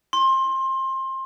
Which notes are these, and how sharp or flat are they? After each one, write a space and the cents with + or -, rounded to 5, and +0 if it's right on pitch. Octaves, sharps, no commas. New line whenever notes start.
C6 +25